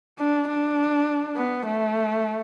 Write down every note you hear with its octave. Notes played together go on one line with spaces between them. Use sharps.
D4
D4
B3
A3